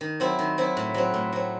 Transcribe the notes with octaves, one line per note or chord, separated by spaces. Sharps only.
D#3
F#3 C4 E4
D#3
F#3 C4 E4
A2
F#3 C4
A2
F#3 C4